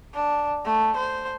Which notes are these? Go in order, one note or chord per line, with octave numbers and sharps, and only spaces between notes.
D4
A3
C5